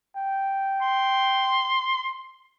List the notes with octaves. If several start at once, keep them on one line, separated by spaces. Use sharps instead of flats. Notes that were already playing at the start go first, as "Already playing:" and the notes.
G5
C6